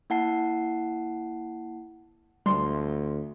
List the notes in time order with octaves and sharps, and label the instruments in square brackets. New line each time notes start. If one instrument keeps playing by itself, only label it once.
[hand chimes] A#3 E4 F#5 A5 C7
[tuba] D2 [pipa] C3 F3 C6 [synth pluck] G3